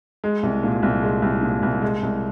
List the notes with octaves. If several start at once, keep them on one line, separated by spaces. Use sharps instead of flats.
G#3
C2
A#2
C2
G#3
C2
A#2
C2
G#3
C2